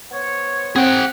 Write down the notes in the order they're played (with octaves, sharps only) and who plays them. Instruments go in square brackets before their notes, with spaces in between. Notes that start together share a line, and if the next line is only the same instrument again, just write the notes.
[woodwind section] B3 C5 C#5
[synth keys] C4 [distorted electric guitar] G#4 G5 [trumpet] F#5